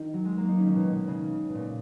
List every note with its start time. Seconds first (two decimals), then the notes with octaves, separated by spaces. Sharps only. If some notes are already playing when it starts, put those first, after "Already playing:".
Already playing: D#3
0.14 F#3
0.25 G#3
0.37 A#3
0.48 D#4
0.58 C#4
0.66 D#3
0.75 B2
0.95 B2
1.08 C#3
1.49 B2
1.55 A#2